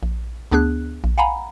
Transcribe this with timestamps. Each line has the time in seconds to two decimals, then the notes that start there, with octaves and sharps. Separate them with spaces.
0.03 A#1
0.52 D2 B3 D4 G#4 F#6
1.04 A#1
1.18 F5 F#5 G#5 A#5 B5